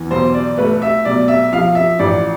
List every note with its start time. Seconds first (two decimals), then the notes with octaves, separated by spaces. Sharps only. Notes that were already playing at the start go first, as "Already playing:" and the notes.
Already playing: E2 E3
0.11 B1 C5
0.34 D5
0.58 A3 B4
0.82 E5
1.05 B1 D5
1.28 E5
1.52 F3 F5
1.75 E5
1.99 A1 D5